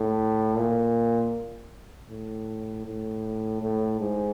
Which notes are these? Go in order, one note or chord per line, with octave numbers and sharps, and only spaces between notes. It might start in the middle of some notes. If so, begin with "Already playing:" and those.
Already playing: A2
A#2
A2
A2
A2
G#2